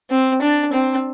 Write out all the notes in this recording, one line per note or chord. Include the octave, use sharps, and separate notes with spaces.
C4
D4
C4